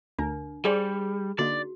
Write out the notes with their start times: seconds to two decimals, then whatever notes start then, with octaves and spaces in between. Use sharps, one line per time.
0.19 D2 D4 A#4
0.65 G3 G#4 C5 D5 G5 G#5
1.39 D3 A#3 D#4 F#4 D5